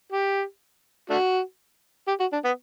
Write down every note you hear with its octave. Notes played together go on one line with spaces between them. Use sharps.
G4
A3 D4 F#4
G4
F#4
D4
B3